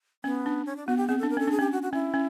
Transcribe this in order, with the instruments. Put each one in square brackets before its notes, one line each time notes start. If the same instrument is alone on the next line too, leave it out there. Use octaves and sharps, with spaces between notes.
[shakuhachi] B3 [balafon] C#4
[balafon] D4
[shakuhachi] C#4
D4
[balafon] B3 [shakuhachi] F#4
[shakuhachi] G4
[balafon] C4 [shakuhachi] G#4
[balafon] D4 [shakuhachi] A4
[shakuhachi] A#4
[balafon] C#4 [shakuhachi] A4
[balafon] D4 [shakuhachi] G#4
[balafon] C#4 [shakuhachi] G4
[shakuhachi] F#4
F#4
[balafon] C#4 [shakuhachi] E4
[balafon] C#4